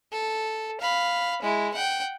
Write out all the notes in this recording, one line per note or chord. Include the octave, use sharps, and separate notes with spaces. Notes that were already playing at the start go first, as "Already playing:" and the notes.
A4
F5 B5
G#3 E4
F#5 G5